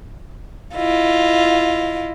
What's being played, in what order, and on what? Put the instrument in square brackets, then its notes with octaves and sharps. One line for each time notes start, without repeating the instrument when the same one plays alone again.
[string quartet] E4 F4 D#5